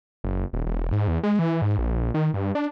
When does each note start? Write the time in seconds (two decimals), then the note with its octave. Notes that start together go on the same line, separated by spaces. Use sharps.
0.24 F#1
0.53 D#1
0.66 E1
0.92 G#2
1.08 E2
1.23 G#3
1.39 E3
1.62 G#2
1.78 A#1
2.14 D#3
2.34 G2
2.55 D4